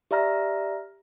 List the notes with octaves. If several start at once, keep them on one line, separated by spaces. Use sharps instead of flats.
G4 D5 E5 A#5 F6 A#6